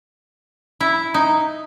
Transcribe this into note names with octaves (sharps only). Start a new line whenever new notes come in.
E4
D#4